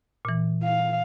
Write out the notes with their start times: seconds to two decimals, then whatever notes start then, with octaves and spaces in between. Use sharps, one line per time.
0.25 A#2 E3
0.64 F5